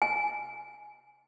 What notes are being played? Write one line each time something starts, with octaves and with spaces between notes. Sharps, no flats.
G#5